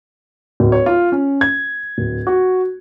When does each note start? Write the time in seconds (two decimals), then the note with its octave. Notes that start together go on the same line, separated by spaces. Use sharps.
0.60 D1
0.72 C#5
0.86 F4
1.12 C#4
1.41 G#6
1.98 D1
2.27 F#4